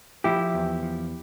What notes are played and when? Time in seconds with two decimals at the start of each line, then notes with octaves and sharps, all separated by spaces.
0.24 F3 E4 G4
0.54 E2
0.83 F3